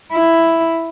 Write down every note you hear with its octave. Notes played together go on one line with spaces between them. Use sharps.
E4